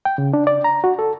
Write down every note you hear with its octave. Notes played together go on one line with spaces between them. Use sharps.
G5
C#3
D4
D5
A#5
F#4
A4